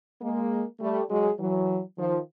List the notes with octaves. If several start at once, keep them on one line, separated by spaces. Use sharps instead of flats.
G#3 A#3
G3 A3
F#3 G#3
E3 F#3
D#3 F3